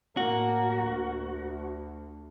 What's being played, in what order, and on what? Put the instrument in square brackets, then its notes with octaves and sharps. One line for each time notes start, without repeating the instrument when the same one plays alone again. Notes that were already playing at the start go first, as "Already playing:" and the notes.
[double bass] A2 A#3 [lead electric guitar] F#4
[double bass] D2